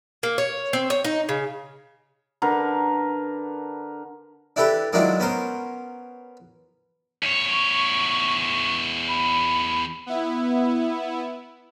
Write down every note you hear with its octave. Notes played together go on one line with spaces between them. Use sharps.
A#3
C#5
C4
C#5
D#4
C#3
D3 A#4 B4
D4 E4 G4 A4 B4
D#3 F#3 G#3 D4 E4 F4
B3 C#4 A#4 C5
E2 C#5
C#6
B5
B3 E4